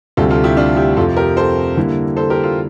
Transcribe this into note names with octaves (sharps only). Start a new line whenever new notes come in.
D2 C3 G3 F4 A4
F4 A4
E4 G4
D4 F4
E4 G4
F2 C3 F3 F4 A4
G4 A#4
A4 C5
D3 G3 A#3 E4
A4 C5
G4 A#4
F4 A4